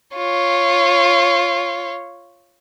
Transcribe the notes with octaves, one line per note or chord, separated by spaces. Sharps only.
F4 C#5